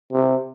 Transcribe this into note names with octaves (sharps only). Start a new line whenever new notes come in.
C3